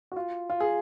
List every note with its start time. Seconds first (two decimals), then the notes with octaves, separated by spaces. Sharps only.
0.12 F#4
0.16 F4
0.50 F4
0.60 G#4